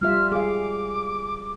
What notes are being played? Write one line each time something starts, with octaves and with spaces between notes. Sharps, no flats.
G3 F4 E5 F6
G#4 F5 D6